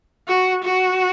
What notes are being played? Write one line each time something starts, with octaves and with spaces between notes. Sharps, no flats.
F#4
F#4